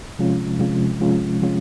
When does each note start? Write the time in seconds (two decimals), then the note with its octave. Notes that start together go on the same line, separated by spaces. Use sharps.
0.19 C3 F3 G#3 C#4 F4
0.60 C3 F3 G#3 C#4 F4
1.01 C3 F3 G#3 C#4 F4
1.42 C3 F3 G#3 C#4 F4